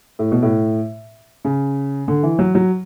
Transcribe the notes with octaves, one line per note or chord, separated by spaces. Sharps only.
A2
B2
A2
C#3
D3
E3
F#3
F#3